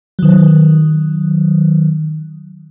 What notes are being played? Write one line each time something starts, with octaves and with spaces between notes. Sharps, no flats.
D#3 F#3